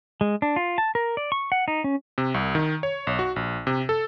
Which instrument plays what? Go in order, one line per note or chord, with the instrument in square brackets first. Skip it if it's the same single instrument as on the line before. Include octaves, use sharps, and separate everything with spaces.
[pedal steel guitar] G#3
D4
F4
A5
A#4
D5
C#6
F#5
D#4
C#4
[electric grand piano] C3
C2
D#3
C#5
B1
F#4
A#1
C3
A4